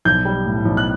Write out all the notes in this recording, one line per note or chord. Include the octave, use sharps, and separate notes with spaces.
B1 G6
G3
A2
B1
F#6